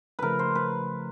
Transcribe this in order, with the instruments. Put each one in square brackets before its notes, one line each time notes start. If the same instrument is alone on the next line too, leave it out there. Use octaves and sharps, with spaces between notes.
[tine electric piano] C#3 F3 A3 [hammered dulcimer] A#4 B4
[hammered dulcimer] C5
B4